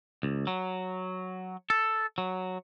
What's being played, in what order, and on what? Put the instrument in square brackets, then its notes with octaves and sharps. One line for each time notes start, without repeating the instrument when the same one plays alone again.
[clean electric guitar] C#2
F#3
A4
F#3